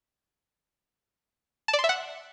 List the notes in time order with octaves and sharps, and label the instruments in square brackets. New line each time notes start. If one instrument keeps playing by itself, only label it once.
[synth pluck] A5
D5
C6
E5
F#5